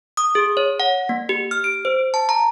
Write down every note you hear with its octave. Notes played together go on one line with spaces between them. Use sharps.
D#6
G#4
C#5
F#5
A#3
G4
F6
D7
C5
A5
A#5